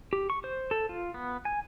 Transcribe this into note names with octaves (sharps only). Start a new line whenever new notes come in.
G4
C#6
C5
A4
F4
B3
G#5